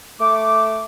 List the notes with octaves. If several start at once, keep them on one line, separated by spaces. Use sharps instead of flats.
A3 D6